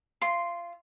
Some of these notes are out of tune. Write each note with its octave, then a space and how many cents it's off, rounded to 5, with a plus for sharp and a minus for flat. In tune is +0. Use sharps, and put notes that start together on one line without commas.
F4 -25 C6 +0